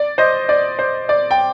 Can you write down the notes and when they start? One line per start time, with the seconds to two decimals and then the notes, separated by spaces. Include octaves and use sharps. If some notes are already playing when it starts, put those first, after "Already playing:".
Already playing: D5
0.18 C5 D#5
0.49 D5
0.79 C5
1.09 D5
1.31 G5